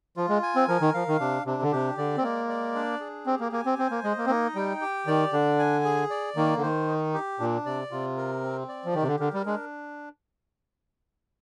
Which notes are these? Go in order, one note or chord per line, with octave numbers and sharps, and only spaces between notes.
F3 F4
G#3
G#5
C4
F3 A#4
D#3
F3 F5
D#3
C3 D4
C3 D4
D3
C3 G4
D3 D5
C4
G#3 A#3
D5
D4
G#4
C4 G4
A#3
A#3 G#5
C4
C4 C5
A#3
G#3 D#5
A#3
C4
A#3 D#4
G3 G5
G4
D#3 D5
D3 D4
G#5
G#4
D5
D#3 A#3
D3
D#3 C5
D#4
G4
A#2 D4
C3 D5
C3 F4
A#4
C4
D5
F3
D#3 G4
C3
D3
D3 A#4
G3
G#3 D4